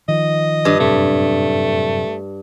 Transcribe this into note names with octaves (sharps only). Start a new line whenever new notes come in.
D#3 F3 D#5
G2
F#2 A2 C3 A3